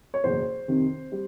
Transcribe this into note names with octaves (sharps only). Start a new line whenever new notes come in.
C#5
F#1 E2 B2 C5
F2 C3 D#3
G3